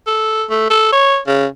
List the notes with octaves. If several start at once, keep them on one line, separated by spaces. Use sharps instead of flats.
A4
A3
A4
C#5
C#3